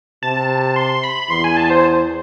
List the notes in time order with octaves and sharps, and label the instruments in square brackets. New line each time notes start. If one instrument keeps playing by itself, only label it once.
[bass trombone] C3 [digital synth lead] A5
[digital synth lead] C6
B5
[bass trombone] E2 [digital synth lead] C6
[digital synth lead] G#5
A5
C5